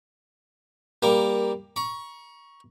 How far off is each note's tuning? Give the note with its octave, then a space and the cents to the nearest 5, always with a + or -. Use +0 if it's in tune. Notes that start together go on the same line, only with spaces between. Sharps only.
G3 +10 A#3 +10 A#4 +0
A#5 +40 C#6 +0